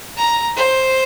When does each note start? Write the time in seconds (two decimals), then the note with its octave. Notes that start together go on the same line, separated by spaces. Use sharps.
0.17 A#5
0.57 C5